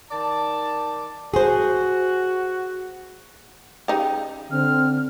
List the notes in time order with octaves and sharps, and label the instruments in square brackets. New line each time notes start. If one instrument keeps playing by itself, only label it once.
[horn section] D#3 D5 A5
[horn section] F#4 [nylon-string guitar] G#4 C5
[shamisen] C#3 D#4 G4
[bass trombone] D3 [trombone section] C4 [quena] F6